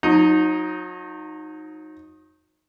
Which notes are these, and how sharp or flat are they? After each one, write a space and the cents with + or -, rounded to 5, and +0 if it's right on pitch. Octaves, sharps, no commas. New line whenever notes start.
F#3 -40 D#4 +0